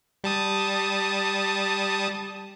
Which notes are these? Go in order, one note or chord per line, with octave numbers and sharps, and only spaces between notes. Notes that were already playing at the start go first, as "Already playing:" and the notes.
G3 A5 D#6